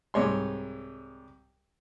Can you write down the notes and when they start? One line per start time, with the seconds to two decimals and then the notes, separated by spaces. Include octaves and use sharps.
0.14 C2 G#2 C#5 C6